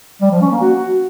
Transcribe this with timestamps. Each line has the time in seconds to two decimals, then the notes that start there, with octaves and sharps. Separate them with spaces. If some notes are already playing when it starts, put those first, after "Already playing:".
0.22 G3
0.31 F3
0.41 C#4
0.51 A#3
0.61 F#4